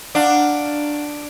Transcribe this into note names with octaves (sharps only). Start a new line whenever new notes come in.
D4 F#4 A#4 F5